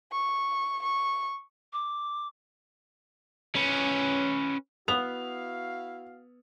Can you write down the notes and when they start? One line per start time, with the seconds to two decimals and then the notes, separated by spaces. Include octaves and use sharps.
0.12 C#6
0.83 C#6
1.73 D6
3.55 C#4 B4
4.88 B3 E4 F#4 F5 F7